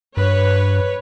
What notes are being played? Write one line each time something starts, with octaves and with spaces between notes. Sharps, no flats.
G2 B4 C#5